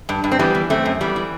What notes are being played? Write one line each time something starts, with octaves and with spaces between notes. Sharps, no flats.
G2
G2
C4
E3 G3 B3
E3
F#2 A3 C4
F#2
E3 G3 B3
E3